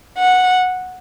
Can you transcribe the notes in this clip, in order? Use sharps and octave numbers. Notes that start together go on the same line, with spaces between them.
F#5